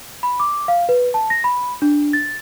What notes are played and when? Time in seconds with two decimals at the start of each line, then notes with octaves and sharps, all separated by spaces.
0.23 B5
0.40 D6
0.68 F5
0.89 B4
1.14 A5
1.30 A#6
1.44 B5
1.82 D4
2.13 A6